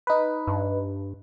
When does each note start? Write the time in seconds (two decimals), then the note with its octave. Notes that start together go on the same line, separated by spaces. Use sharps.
0.07 D#4 B4
0.47 G2